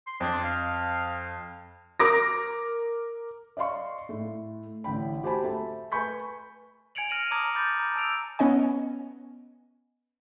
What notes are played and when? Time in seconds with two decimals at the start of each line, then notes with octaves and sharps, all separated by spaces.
0.07 C6
0.20 F2 D4
0.44 F5
2.00 A#4 D6 A#6
3.57 D5 D#5 F5 C6 C#6
4.09 A2 A3
4.84 A1 D3 G5 B5
5.23 F#4 G4 C5 G#5 A5 B5
5.44 A3 A5
5.92 B4 G#5 B5 C#6 G6 B6
6.95 G#5 G#6 C#7 D7 F7 F#7
7.10 F6 A#6 D#7 F7 F#7
7.31 A5 A#5 D6 D#6 F6 G#6
7.55 B5 D6 G6 A6
7.79 A#5
7.96 A5 E6 D7 F7
8.39 B3 C#4 D#5 G#5